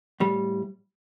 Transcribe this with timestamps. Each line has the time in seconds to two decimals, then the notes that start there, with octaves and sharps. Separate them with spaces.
0.20 A2 G3